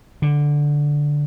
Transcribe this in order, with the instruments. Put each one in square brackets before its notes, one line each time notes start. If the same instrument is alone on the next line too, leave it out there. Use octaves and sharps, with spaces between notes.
[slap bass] D3